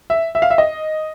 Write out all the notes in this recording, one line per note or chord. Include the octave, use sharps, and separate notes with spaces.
E5
E5
F5
E5
D#5